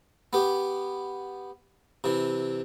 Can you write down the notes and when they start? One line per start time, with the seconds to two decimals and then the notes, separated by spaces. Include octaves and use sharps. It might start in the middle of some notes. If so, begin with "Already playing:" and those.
0.33 B3 G4
2.04 C3 E3